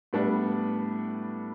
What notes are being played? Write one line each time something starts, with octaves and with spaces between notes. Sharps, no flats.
A2 G3 B3 D4